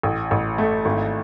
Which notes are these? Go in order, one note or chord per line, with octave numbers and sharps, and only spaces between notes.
A1
A1
A3
G#1